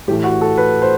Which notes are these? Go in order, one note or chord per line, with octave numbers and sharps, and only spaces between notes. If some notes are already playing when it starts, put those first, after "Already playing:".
A2 E3 A3 G4
F#4
A4
B4
C5